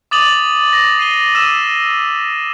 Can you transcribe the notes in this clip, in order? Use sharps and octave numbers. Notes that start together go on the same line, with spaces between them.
D6 D#6 A6 D#7 F7 F#7
A#6
C7 D#7 G7
E6 B6 D#7 E7